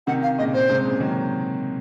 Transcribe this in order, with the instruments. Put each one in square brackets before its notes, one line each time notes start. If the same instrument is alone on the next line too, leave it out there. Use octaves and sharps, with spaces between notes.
[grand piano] C3 D#3 [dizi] F#5
[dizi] F5
[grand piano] A#2 C#3 [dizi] D#5
[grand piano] A#2 [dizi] C5
[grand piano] G#2 C3
A#2 C#3
D#3 F#3